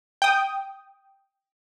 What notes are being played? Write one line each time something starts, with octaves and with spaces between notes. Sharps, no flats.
G5 D#6